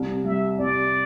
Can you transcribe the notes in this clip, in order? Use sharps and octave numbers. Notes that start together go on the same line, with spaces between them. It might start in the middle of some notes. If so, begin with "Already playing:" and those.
Already playing: C2
G3 E5
C2 D5